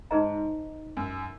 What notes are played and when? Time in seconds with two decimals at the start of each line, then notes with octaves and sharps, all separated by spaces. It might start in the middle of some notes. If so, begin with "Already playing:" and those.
0.11 G#2 D#4 G#4 C5 D#5 A#5
0.97 F#2